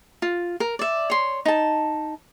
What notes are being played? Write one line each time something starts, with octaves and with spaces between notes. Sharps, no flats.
F4
A#4
D5 E5
C#5 C6
D#4 A5